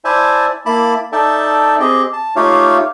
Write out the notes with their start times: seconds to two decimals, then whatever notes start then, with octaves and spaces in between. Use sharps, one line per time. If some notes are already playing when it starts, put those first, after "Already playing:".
0.05 E4 C5 D5 E5 G#5 A5
0.66 A#3 E4 A5 B5 D6
1.12 D#4 A4 D5 E5 G5 A5
1.80 C4 G4 G#4 D#5
2.13 A5
2.36 A3 D#4 F4 G4 C#5 F5